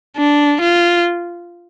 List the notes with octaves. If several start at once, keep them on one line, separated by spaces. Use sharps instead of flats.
D4
F4